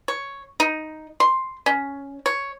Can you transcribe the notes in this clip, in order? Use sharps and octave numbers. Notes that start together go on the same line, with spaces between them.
C#5
D#4
C6
C#4
C#5